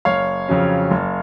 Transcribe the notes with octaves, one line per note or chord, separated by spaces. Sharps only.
F#1 C#5 F5
F2 C#3 F#3 C#4
F#1